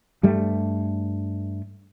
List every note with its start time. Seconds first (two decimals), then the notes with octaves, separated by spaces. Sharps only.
0.23 G2 G3 A3